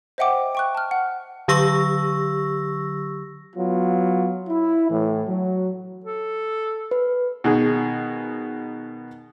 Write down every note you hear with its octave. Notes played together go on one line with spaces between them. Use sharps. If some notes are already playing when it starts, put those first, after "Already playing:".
C5 D#5 E5 F#5 G5 D6
G5 C#6 F#6
A5 F6
F#5
D3 F#3 G4 C#6 E6 A#6
F#3 B3 F4
E4
A2 E3
F#3
A4
B4
B2 D#3 G#4